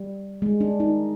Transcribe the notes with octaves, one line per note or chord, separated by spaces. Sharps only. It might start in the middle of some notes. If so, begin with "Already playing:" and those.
Already playing: G3
G#3
D4
D#4